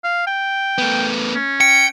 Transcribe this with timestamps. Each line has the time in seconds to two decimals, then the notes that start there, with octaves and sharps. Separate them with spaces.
0.04 F5
0.27 G5
0.78 A3 B3
1.35 C#4
1.61 G5 C#7